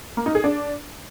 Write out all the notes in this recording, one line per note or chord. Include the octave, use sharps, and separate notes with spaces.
A#3
D#4
G#4
D4